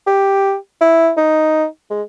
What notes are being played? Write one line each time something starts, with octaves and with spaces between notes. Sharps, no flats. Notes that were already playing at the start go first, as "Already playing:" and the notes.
G4
E4
D#4
G#3